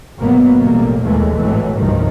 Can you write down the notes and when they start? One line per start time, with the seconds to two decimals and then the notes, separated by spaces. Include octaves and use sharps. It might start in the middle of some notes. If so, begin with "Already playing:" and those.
0.19 G1 B2 F#3 G3 A#3 B3
0.59 A1 G3 A#3
1.03 D#2 A#2 E3 G#3 A3
1.37 G#1 A2 E3 F#3
1.78 C2 G2 D#3 F3